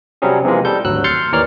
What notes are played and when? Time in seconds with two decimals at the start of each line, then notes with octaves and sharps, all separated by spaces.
0.22 C3 F#3 G3 C4 C#4 G#4
0.45 C3 E3 F3 G#3 A#3
0.65 G3 A4 G6
0.85 G#1 D2 F#3 E6 F#6
1.04 C6 F6 G6 A6 C7 C#7
1.32 D#2 E3 A#4 C#5 D5 F6